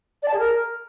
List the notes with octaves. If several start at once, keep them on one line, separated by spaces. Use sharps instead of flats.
D5
A5
G#4
A#4